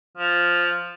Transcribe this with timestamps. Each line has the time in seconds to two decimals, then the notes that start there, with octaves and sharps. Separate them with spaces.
0.17 F3